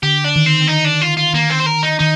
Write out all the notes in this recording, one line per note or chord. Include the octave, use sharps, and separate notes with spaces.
D3 G4
D4
D#3
C4
D#4
D4
F4
F4
D#3 A#3
C4
C5
A#4
D#4
D#3 D#4